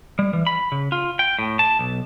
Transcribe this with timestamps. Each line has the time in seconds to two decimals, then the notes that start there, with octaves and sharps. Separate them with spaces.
0.19 G3
0.33 E3
0.47 B5
0.72 C#3
0.92 F4
1.19 G5
1.39 A2
1.59 A5
1.79 B1